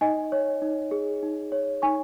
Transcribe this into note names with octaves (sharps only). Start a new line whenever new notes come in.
D#4 D#5 G#5
C#5
D#4
G#4
D#4
C#5
D#4 G#5 C#6